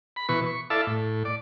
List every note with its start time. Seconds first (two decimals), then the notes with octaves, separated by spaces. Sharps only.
0.16 B5
0.29 B2 E3 B4 C#6
0.46 C#6
0.70 E4 A4 D5 E5 F5 A5
0.87 A2
1.25 D5